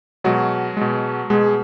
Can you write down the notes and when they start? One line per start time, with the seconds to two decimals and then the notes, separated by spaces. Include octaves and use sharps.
0.24 B2 F#3 G#3 F#4
0.77 B2 G#3
1.30 B2 G#3 G#4